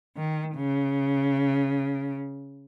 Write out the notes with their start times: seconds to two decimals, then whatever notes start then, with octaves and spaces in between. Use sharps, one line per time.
0.17 D#3
0.55 C#3